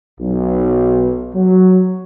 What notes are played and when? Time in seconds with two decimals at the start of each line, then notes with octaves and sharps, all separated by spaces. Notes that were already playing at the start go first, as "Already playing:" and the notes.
0.20 B1
1.35 F#3